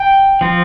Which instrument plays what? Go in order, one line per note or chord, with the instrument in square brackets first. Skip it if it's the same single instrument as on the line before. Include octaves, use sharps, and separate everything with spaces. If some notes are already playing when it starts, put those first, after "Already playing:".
Already playing: [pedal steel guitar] G5
F3 C4